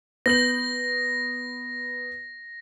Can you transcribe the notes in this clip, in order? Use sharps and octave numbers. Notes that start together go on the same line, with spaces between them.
B3 G6 A#6 F#7